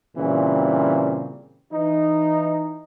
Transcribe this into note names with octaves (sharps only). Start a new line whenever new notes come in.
A#2 C#3 E3 G3 C4
E3 D#4